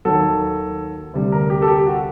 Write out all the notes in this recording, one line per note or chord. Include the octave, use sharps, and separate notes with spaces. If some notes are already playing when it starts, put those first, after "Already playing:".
D#2 D#3 F#3 A4
D2 C3 G3
A#4
G4
A4
G4
F#4